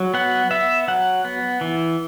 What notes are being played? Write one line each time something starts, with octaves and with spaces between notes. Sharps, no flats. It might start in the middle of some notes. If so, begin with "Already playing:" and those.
Already playing: F#3
B3 F#5
B3 E5
F#3 F#5
B3
E3